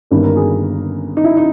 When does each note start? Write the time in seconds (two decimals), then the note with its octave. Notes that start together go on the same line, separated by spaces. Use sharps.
0.11 G1 G2 D#3 A#3 C#4 A#4
0.24 A#4
0.37 G#4
1.17 D#4
1.24 E4
1.37 D#4